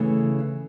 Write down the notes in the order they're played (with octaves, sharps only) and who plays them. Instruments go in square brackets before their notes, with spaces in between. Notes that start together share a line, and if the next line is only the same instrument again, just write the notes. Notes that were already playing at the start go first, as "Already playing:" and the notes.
Already playing: [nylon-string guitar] C#3 E3 A3